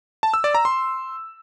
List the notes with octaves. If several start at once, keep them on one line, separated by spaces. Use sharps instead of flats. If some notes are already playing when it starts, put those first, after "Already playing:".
A5
E6
D5
A#5
C6